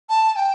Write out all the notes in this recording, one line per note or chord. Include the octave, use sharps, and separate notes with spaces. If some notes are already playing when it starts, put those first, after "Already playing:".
A5
G5